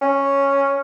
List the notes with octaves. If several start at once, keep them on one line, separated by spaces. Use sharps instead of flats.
C#4